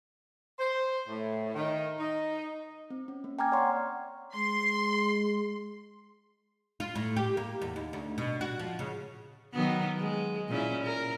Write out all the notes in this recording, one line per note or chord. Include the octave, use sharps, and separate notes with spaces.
C5
A2
D#3
D#4
C4
C#4
A#3
G5 G#5 A#5 D6 F6 G#6
C#5 D5 F#5 C6 C#6
G#3 C6
F4
A2
G4
A#3
E2
D#2
D2
B2
F#4
F3
C#3
D#3 F#3 B3
G#3
A#2 C#4 E4
A#4